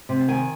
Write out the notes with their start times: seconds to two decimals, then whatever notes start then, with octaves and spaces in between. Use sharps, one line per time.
0.09 C3
0.19 A5
0.28 D#3 G#5